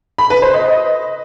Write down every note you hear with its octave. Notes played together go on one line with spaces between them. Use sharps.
B5
B4
C5
D#5